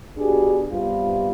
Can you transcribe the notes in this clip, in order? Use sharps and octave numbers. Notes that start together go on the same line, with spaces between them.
B2 D4 G4 G#4
G2 C3 B3 F4